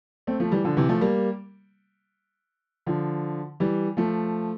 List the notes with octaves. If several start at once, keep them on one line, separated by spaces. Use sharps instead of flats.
A3 C4
F3 A3
E3 G3
D3 F3
C3 E3
F3 A3
G3 A#3
D3 F3
E3 G3
F3 A3